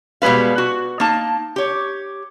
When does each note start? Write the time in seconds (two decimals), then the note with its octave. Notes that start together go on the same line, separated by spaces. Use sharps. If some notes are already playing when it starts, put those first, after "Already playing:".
0.22 B2 G3 G#3 B4 F5
0.58 F#4
1.00 A#3 D#4 A5
1.56 G4 C#5